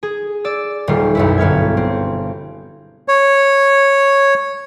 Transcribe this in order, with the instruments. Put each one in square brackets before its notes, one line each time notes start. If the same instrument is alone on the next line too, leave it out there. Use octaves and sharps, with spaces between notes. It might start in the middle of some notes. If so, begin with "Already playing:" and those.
[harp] G#4
D5 E6
D#1 D#3 G3 F4
B1 F#2 E4
G1 B3 F6 G#6
C4
[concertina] C#5